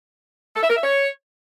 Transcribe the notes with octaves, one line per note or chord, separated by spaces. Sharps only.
A4
E5
A#4
E5
C#5